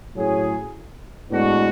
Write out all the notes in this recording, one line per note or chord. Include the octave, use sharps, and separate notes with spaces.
A2 F#3 C#4 G#4
A2 G#3 B3 D4 F#4